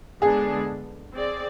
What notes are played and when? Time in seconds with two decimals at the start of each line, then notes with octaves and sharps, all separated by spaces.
0.22 D3 G#3 B3 D4 G#4
1.13 C4 G#4 D5